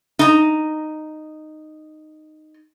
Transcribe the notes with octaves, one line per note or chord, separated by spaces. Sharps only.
D#4 A#5